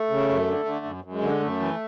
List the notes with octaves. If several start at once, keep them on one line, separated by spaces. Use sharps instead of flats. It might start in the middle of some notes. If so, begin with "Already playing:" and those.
Already playing: A3
C#3
F#2
D3
D3
F#2
F#2
G#3
D3
F#2 A3
E3